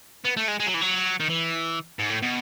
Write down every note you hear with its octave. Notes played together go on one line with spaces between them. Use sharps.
B3
A3
G#3
G#3
F#3
E3
F#3
D#3
E3
G#2
A2
B2